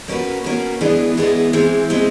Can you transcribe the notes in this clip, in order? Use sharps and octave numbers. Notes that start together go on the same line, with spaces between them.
A#3 C#4 F#4 B4
A#3 C#4 F#4 B4
E3 G#3 B3 D4
E3 G#3 B3 D4
E3 G#3 C4
E3 G#3 C4